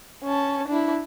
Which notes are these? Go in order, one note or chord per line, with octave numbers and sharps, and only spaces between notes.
C#4 A5
D4 E4